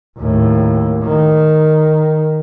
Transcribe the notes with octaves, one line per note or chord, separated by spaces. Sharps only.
D#2 A2
D#3